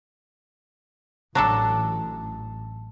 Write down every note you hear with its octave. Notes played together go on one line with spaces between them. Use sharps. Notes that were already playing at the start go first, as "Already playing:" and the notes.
A1 F#3 D4 A4 A5